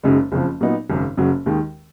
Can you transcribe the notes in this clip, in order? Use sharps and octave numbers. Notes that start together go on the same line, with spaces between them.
F#1 F#2 C#3 G#3 D#4
F#1 F2 C#3 F3
A#2 F#3 B3 D#4
G#1 F#2 C#3
F#1 F#2 C#3 F#3
D#2 D#3 G#3